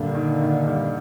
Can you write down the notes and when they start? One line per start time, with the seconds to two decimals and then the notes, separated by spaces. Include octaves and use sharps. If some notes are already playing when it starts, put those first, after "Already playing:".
Already playing: G2 A#2 D3
0.15 D#3
0.42 D#3
0.67 G2